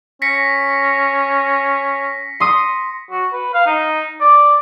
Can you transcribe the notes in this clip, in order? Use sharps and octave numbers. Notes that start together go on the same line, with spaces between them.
C#4 A#6 B6 C#7
C6 D#6
F#4
B4
F5
D#4
D5